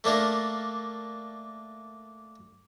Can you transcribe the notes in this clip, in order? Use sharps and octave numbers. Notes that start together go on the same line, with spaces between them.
A3 A#3 D4 A#4